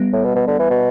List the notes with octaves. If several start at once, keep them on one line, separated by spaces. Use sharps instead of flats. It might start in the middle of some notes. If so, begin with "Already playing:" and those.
Already playing: G3 B3
A2
B2
B2
D3
E3
B2